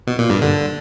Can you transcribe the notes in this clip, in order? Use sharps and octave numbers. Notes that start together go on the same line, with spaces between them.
B2
A#2
G2
D3